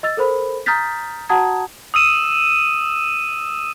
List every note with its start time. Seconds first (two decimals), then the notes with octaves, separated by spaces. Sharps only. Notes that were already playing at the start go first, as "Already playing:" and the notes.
0.03 D#5 E6 A6
0.17 A4 A#4 C5 B5
0.66 A#5 D#6 F6 G6 A6 B6
1.29 F#4 F#5 A5 A#5 D#6 G#6
1.94 D#6 E6 D#7 E7